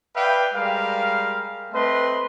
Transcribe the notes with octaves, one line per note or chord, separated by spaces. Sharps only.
B4 D5 E5 F5 G5
G3 G#3 A#4 F5
A3 C4 B4 D#5 C6